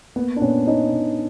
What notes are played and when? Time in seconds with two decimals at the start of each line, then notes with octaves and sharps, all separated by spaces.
0.16 A#3 B3
0.36 D4
0.41 A#2 B3 C#4
0.67 A#3 C#4 D#4
0.92 A#2